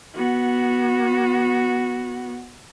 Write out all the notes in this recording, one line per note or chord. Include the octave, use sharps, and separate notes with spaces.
B3 F#4